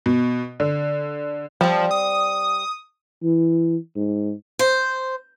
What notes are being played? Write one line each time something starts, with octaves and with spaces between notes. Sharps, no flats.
B2
D3
F3 G3 C4
D#6
E3
G#2
C5